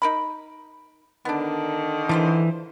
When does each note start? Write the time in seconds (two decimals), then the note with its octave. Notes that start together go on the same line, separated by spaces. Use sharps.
0.02 D#4 A#4 B5
1.25 D3 D#3 B3 D4
2.09 E3 D4 F4 C5